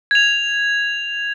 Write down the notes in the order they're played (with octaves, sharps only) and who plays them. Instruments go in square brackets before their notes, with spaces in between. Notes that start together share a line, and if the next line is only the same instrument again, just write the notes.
[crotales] G#6 F7